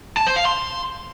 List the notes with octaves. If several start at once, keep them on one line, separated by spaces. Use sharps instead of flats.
A5
C5
F5
C6